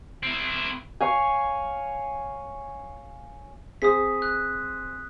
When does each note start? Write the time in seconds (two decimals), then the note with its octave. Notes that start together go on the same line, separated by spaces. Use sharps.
0.23 C4 E4
1.01 C#5 F5 G#5
3.82 C4 G#4 C5 D#6 B6
4.22 F#6